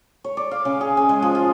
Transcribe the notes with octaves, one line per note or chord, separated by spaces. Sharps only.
C#5
D5
F5
C#3
G#4
G#5
G#3
F3
F4